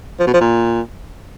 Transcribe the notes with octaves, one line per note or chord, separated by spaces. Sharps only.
F3
B2
F3
A#2